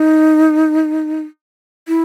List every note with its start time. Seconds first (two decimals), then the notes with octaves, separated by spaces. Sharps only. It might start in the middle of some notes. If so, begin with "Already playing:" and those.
Already playing: D#4
1.88 E4